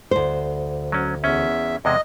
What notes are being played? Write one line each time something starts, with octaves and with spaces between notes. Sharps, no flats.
D2 C5
F#3 C#4
E2 C#4 E5
E2 C3 G#3 D#5